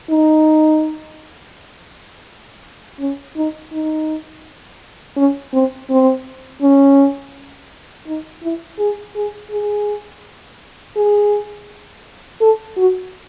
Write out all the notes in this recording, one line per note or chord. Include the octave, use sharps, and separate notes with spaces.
D#4
C#4
D#4
D#4
C#4
C4
C4
C#4
D#4
E4
G#4
G#4
G#4
G#4
A4
F#4